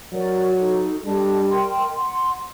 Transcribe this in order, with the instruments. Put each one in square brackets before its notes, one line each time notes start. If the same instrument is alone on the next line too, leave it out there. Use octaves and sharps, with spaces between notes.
[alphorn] F#3 [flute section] F#4 A#4 D5
[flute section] D#4 F#4 A4
[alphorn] G3 [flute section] D4 A4 D#5 A5
[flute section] A#4 D#5 G5 C6
F#5 C6